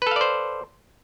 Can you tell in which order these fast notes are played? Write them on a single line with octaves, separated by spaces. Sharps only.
B4 A4 F5 D5 C5